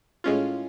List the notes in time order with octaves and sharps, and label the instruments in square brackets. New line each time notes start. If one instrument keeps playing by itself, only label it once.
[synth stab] A2 G#3 C#4 F4